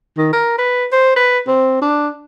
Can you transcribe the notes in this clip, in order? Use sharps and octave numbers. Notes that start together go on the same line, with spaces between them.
D#3
A#4
B4
C5
B4
C4
D4